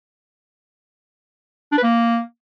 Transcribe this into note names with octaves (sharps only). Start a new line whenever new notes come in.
D4
B4
A#3